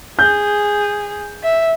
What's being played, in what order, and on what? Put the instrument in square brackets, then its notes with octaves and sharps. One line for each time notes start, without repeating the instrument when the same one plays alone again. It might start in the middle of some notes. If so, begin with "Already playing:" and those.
[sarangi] G#4 [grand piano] G6
[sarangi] E5